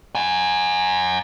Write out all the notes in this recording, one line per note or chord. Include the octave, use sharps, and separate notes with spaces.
F#5 G#5